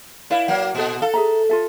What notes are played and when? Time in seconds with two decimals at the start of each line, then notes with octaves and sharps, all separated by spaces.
0.30 E4 B4 D5 F5
0.48 F#3 A#3
0.75 A#2 A4 D#5
1.02 A4 F5
1.14 G#4 E5 A#5
1.49 F4 A4 E5